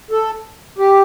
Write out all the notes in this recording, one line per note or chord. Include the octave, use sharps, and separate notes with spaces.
A4
G4